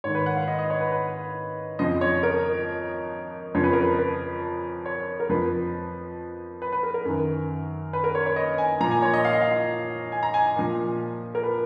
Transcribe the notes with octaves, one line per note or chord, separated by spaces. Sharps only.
G#2 D#3 C#5
B4
F#5
F5
D#5
D#5
C#5
B4
B4
F2 C#3 F3 D#5
C#5
A#4
F2 C#3 F3 C#5
B4
A#4
B4
B4
C#5
A#4
F2 F3 B4
B4
B4
A#4
A#4
F#2 D#3
B4
A#4
C#5
C#5
D#5
G#5
A#2 F3 A#5
G#5
C#5
D#5
F5
D#5
F5
G#5
A#5
G#5
A#2 F3
A#4
B4